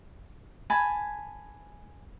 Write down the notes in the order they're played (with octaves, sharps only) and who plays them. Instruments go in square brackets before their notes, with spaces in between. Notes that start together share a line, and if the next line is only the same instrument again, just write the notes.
[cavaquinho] G#5 A5 B5